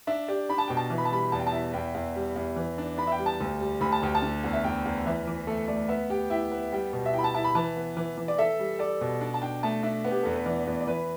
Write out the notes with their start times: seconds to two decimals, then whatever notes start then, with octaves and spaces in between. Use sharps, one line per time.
0.07 D4 E5
0.28 G4 D5
0.49 D4 B5
0.58 A5
0.68 B2 G5
0.77 A5
0.90 E3
0.98 B5
1.05 A5
1.12 G3 B5
1.32 E2 A5
1.39 G5
1.47 A5
1.52 E4
1.74 E2 G5
1.94 E2
2.16 G3
2.36 E2
2.56 E3
2.78 D4
2.98 D4 B5
3.07 E5
3.12 G5
3.19 G3
3.26 A5
3.40 D2
3.60 G3
3.81 D2 B5
3.92 A5
4.03 D2 G5
4.15 A5
4.22 D3
4.44 E2
4.53 E5
4.64 E2 G5
4.85 E2
5.06 E3 E5
5.27 E3
5.47 A3 A4
5.68 A3 D5
5.88 B3 E5
6.10 G4 G5
6.30 E4 G5
6.51 B3
6.72 G3 G5
6.93 B2
7.06 E5
7.13 E4 G5
7.19 B5
7.24 A5
7.34 E4 A5
7.44 B5
7.55 E3 A5
7.76 B3
7.97 E3
8.18 E3
8.28 D5
8.38 A4 E5
8.60 G3
8.79 A4 D5
9.01 B2
9.21 D4
9.34 A5
9.42 D4 G5
9.63 A3 A5
9.83 D4 E5
10.04 B3
10.11 G4
10.23 E2 A4
10.35 B4
10.46 E3 D5
10.67 E2
10.80 D5
10.87 E3 B4